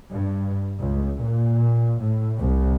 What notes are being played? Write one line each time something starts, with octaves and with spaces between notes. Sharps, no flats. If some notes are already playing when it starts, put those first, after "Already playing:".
G2
C#2
A#2
A2
C2